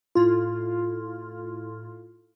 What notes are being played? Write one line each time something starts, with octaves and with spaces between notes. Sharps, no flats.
A2 F4